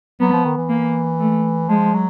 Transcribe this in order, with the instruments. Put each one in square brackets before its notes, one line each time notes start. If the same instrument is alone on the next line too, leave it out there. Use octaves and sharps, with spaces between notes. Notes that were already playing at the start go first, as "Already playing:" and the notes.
[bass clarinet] F#3 [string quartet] B3
[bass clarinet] F3
D#3
E3
[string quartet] A#3
A3
[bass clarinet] F3 [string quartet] G#3
[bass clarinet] F#3